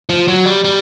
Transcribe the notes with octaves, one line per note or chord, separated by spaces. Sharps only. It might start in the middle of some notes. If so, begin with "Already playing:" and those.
F3
F#3
G3
G3